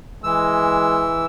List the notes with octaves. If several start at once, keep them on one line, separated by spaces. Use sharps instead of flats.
E3 G#3 E6